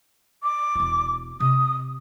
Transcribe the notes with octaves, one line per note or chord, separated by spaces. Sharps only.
D6
E1 E4
C3 D#6